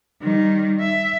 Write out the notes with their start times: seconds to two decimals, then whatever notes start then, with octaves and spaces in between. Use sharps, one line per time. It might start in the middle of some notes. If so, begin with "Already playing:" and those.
0.22 D#3 G3
0.80 E5